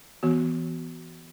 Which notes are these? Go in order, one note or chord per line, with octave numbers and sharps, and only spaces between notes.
E3 B3 F#4